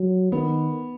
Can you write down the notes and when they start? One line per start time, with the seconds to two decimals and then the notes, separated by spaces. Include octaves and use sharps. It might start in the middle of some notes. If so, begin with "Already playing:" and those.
Already playing: F#3
0.31 D#3 B3